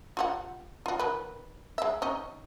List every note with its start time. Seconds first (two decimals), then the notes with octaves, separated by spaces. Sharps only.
0.17 F4 G4 F#5
0.86 F4 F#4
0.99 D#3 B4
1.78 G#3 E5
2.02 C#4 D#4 D#5